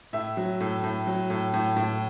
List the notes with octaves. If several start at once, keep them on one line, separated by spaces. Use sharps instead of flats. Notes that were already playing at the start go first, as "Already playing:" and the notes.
A2 E5
F#3
A2
A2
F#3
A2
A2
A2